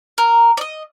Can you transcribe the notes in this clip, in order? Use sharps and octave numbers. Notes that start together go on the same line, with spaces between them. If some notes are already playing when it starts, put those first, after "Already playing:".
A#4
D5 D#5